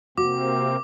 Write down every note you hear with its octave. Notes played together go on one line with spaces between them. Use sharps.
C3 A#3 C4 F#4 D6